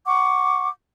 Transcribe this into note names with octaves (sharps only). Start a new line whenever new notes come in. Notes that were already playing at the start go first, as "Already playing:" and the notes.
F#5 C#6 D6